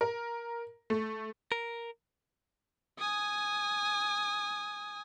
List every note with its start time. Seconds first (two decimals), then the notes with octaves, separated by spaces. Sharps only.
0.01 A#4
0.90 A3
1.52 A#4
2.98 G#5 D#6